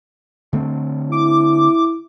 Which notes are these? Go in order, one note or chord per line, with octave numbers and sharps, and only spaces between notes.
D3 A3 C4
E4 D6